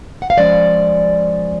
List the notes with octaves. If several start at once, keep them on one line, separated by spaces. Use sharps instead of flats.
F#5
F5
F3 G#3 C#4 D5